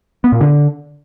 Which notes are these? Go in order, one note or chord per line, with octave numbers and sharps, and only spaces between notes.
B3
A#2
D3